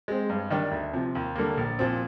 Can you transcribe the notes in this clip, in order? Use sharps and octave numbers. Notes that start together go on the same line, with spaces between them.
G#3 C4
G2
D#3 G3 D4
D2
C3 F3
D#2
D3 G3 A#3
A#1
A#2 F3 C4